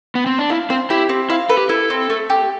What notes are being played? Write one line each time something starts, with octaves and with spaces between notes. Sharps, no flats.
B3
C4
D4
E4 F5
C4 C5
E4 G4
C4
E4 F5
A4 B4
G4
E4 A4
C4
A3
G4